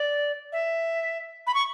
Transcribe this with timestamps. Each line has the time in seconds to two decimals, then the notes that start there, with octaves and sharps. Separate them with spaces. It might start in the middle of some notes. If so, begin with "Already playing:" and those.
Already playing: D5
0.52 E5
1.47 B5
1.54 C#6